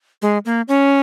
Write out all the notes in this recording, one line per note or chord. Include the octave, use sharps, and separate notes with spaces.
G#3
A#3
C#4